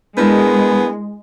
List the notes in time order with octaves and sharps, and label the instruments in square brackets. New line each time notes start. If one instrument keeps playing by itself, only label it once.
[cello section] G#3 [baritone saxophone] B3 [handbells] D4 E4 A#4 [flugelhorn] G#4